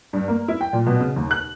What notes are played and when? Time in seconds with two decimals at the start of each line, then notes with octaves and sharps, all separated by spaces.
0.13 G2
0.28 A#3
0.48 E4
0.61 G5
0.73 A#2
0.86 B2
1.00 C#3
1.16 D#2
1.31 F#6